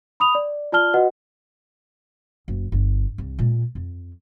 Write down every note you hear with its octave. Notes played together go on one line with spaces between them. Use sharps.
B5 D#6 F7
D5
F4 D5 A5 F6 G7
F#4 B4 D#5 F#5
F#1
G1
C2
A#2 G#3
F2